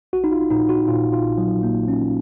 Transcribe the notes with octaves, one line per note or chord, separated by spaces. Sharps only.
A#1 F#4
D#4
F4
A#2 D#4
F#4
A#2 F4
F4
A#1
F#3
A#2 A#3
C#4